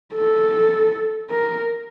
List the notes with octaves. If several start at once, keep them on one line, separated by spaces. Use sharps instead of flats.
A4
A#4